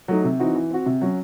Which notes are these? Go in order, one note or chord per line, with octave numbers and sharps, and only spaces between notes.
F#3 A3 D#4
C3
E3 C4 D#4 F#4
E3
C4 F#4
C3
F#3 C#4